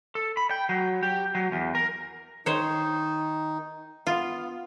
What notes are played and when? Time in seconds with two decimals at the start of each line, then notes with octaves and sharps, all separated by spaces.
0.15 A4
0.37 B5
0.51 G5
0.69 F#3
1.03 G4
1.35 F#3
1.52 E2
1.75 A#4
2.46 D#3 D#4 C5 C#5
4.07 B3 F4